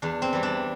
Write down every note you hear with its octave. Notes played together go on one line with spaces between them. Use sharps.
E2 D4
C4
E3 G3
D4